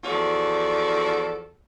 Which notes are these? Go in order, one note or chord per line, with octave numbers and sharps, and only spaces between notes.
E2 F3 F#4 A4 D5